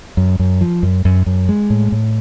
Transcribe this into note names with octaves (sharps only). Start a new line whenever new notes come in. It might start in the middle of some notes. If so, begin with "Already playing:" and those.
F#2
F#2
F3
F#2
F#2
F#2
G#3
A2
A2